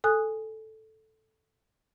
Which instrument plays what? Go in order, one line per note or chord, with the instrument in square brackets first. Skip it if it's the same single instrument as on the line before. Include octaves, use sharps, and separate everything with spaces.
[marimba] A4 G#5 D#6 F#6